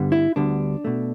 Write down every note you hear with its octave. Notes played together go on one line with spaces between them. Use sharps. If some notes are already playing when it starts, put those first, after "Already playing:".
Already playing: G2 D3 G3 B3
E4
D2 D3 G3 B3 D4
B2 A3